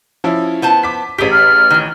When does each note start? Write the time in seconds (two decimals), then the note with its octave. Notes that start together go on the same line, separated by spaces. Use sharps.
0.24 F3 C#4 E4
0.62 B3 C5 A5
0.83 D6 B6
1.18 A1 G4 G#4 B6
1.32 F6
1.70 D#3 E3